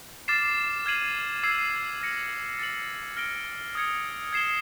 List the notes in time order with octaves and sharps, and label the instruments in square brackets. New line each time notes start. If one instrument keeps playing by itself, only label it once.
[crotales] D6 F6 A6 C7 E7
F6 G#6 C7 D#7 F#7
E6 G#6 C7 D#7
F6 A#6 C#7
A6 C#7 F#7
F6 A#6 D7 G7
D#6 G#6 C#7
G#6 C7 E7 G7